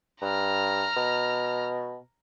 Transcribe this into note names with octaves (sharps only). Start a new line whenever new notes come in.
G2 A#5 F6
B2